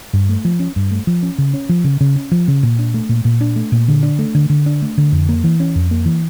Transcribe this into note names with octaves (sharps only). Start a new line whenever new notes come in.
G2
A3
F3
C#4
G2
A3
F3
C#4
C#3
C#4
F3
C#3
C#3
C#4
F3
C#3
A#2
D4
A3
A#2
A#2
D4
A3
A#2
D3
D4
A3
D3
D3
D4
A3
D3
F2
A#3
E3
C#4
F2
A#3
E3